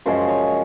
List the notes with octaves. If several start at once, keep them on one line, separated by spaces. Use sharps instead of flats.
F#2 C#3 F3 G#3 C5
C#5